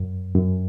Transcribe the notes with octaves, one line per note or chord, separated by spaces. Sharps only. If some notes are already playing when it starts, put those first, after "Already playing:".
Already playing: F#2
F#2